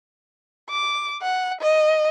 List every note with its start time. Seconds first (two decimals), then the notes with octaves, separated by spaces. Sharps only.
0.69 D6
1.22 F#5
1.61 D#5